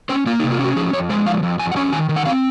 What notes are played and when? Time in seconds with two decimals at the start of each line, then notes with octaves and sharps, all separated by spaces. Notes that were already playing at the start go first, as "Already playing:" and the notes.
0.09 C#4 C5
0.26 A#3 F4
0.40 D#4
0.43 C3
0.52 F4
0.59 C#4 F#4
0.76 F3 G#4
0.93 F2 C#5
1.09 G#3 C5
1.26 F3 F5
1.43 F2
1.59 F2 G#5
1.72 F#5
1.76 C#4 G#5
1.92 D#3 G#5
2.09 D#3
2.16 F#5
2.25 C4 F5